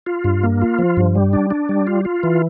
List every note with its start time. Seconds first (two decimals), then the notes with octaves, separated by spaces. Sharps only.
0.06 F4
0.24 G2
0.43 A#3
0.62 F4
0.79 F3
0.97 G2
1.15 G3
1.33 D4
1.51 D4
1.69 G3
1.87 F4
2.05 F4
2.23 E3